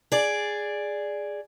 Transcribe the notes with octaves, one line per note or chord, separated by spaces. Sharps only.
G#4 D5